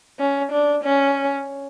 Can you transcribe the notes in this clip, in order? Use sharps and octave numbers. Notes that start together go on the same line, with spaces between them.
C#4
D4
C#4